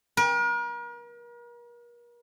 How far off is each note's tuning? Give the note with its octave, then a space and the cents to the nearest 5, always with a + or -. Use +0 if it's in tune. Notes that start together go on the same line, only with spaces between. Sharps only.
A#4 +40